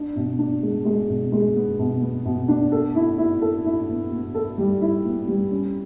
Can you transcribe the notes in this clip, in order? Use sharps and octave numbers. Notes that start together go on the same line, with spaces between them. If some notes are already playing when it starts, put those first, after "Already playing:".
Already playing: D4
B2
D4
G#3
G#3
B2
G#3
B3
B2
B3
B2
D4
A4
E4
E4
A4
E4
B3
B3
A4
G3
E4
B3
G3
C#4